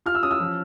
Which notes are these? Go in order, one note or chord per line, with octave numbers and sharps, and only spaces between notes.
F4 F6
E6
C#4 D#6
E6
F3